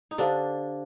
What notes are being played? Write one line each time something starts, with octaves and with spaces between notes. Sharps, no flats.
D#4
D3 D4 G4 C5 F5